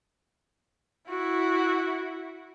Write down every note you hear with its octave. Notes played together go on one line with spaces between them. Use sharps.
E4 F#4